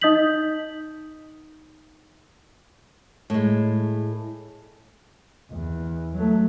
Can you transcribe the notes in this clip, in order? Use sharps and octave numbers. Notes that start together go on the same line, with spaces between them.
D#4 D#5 D#6 G6 B6 F#7
A2 G#3
E2
F#3 A3